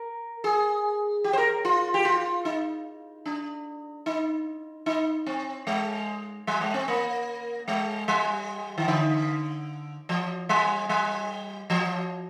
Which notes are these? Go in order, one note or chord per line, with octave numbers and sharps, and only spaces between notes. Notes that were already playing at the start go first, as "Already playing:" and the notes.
Already playing: A#4
G#4
G4
C5
A#4
F4
G4
F4
D#4
D4
D#4
D#4
C4
G#3
G3
G#3
C4
A#3
G#3
G3
D#3
D3
F3
G3
G3
F3